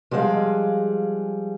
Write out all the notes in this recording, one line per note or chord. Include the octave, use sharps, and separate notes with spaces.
F3 G3 G#3 G#4 F5